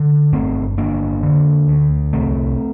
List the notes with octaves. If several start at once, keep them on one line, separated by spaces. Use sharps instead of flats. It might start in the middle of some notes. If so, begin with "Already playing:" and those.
Already playing: D3
G1 A3 C4
G1 A#3 D4
D3
D2
C2 A3 C4